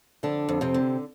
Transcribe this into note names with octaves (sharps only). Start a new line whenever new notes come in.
F2 D3 D4
F2
C3 C4
D3